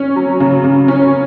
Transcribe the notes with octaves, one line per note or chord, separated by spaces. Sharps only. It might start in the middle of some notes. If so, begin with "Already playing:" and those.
Already playing: C#4
F#3
C#3
C#3
C#4